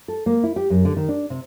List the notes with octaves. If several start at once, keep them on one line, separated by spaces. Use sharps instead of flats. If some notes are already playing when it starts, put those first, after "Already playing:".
A4
A#3
E4
G4
F#2
D3
D#3
D4
C3